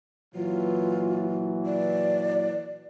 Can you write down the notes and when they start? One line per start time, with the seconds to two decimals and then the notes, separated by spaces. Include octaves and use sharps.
0.35 A#2 E3 F#3 F4
1.66 D5